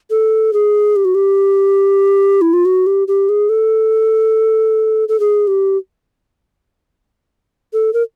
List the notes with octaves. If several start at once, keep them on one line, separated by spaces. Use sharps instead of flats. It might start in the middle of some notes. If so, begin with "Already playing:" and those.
A4
G#4
G4
F#4
G4
E4
F4
F#4
G4
G4
G#4
A4
A4
G#4
G4
A4
A#4